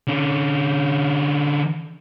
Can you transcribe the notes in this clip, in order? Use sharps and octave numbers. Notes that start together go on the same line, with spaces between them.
D3 C#4